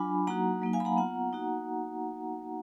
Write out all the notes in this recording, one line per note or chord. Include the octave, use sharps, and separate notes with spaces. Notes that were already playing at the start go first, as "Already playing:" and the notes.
Already playing: F#3 D4 F4 G#5 B5
F#3 A#3 D#4 F#4 F#5 A#5
F#3 A#3 D#4
F5 G#5
B5
F#5 A#5
B3 F4 F#5 A#5
A#3 D#4 F#4